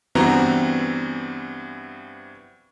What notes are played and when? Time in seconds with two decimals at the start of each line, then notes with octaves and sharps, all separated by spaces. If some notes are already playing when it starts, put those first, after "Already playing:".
0.15 G2 E3 B3 C4 F#4 A#5